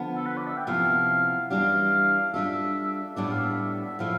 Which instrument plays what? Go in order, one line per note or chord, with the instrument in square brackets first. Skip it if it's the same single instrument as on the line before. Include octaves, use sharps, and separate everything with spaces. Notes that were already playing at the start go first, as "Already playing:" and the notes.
Already playing: [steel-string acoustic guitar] D3 F3 B3
[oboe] A4
B4
D5
E5
G5
[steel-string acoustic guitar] C3 F3 B3 E4 [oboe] F5
[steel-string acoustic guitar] E3 G3 D4 G4 [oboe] F5
[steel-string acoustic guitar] G3 D4 F4 A4 [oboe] E5
[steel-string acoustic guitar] A2 G3 B3 D4 A4 [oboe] D5
[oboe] F5
E5
[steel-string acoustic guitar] A2 F3 A3 E4 [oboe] F5